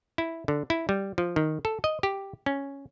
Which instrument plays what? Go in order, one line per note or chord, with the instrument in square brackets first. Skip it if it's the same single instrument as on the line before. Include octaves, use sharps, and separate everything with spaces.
[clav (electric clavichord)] E4
D3
E4
G3
F3
D#3
A4
D#5
G4
C#4